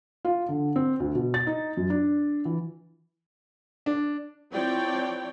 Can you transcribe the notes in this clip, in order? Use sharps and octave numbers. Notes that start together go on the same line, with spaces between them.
F4
D3
C4
D2
B2
A6
D#4
F#2
D4
E3
D4
F3 C4 E4 C#5 D5 G5